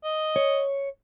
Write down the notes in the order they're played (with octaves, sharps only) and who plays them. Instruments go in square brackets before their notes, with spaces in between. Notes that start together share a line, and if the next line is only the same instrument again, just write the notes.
[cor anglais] D#5
[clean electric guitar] C#5